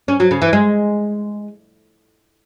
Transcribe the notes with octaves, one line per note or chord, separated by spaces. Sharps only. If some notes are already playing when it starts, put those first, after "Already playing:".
C#4
F#3
C#3
E3
G#3